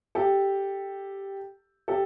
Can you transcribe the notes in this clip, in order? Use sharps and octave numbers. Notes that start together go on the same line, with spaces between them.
G4 A4
G4 A4